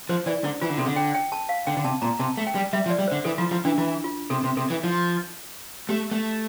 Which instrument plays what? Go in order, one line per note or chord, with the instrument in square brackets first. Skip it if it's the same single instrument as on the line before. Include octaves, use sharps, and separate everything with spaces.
[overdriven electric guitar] F3 [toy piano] C5
[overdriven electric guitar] E3 [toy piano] D5
[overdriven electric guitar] D3 [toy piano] E4
[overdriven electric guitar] E3 [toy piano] F4
[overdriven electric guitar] D3
[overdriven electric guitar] C3 [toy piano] A4
[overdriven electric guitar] D3
[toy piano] G5
G5
A5
F5
[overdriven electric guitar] D3 [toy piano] G5
[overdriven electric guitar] D3
[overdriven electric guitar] C3 [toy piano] A5
[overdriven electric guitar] A#2 [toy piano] A#5
[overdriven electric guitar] C3 [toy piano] A5
[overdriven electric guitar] A3
[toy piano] G5
[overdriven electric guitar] G3
[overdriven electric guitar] G3 [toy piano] E5
[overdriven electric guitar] F3
[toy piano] D5
[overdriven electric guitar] G3
[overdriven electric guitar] D3 [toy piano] C5
[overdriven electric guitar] E3 [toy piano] A4
[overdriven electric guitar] F3 [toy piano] F4
[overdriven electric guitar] F3 [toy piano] E4
[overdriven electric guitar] E3 [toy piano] D4
[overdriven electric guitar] E3 [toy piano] E4
[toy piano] F4
[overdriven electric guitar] C3 [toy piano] A4
[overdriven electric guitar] C3
[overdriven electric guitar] C3 [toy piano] A4
[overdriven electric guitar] E3
F3
[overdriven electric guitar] A3 [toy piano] G4
[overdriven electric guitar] A3